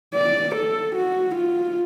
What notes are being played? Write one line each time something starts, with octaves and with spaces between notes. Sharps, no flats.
D5
A4
F#4
F4